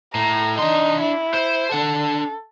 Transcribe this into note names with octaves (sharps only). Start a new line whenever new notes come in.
A2 A#5
D4 D#4 C6
E4
C5
D4 A4 F#5